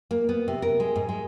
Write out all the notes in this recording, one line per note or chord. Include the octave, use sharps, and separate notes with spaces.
A#3
B3
C3
A#4
G#3
G#2
G#3